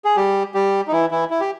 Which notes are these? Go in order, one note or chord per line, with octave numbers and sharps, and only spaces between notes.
G#4
G3 G4
G3 G4
D#4
E3 E4
E3 E4
E4
G4